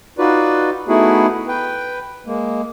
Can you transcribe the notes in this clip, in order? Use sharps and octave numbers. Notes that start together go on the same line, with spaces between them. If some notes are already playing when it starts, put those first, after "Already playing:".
D#4 F4 F#4 B4 D5
A3 B3 D#4 E4 F#4 G#4
B4 G5
G#3 A#3